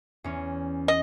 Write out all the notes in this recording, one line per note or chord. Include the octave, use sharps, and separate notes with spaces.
E2 C#4
D#5